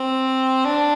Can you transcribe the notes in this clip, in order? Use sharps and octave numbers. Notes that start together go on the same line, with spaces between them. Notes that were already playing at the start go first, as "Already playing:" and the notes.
Already playing: C4
D4